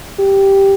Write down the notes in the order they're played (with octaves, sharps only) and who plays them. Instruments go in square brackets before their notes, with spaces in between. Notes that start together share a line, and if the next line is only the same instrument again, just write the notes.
[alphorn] G4